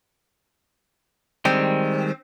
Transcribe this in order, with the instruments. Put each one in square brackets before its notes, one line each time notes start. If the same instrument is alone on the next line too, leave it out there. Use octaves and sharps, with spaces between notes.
[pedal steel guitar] D#3 G3 G#3 [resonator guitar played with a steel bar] C4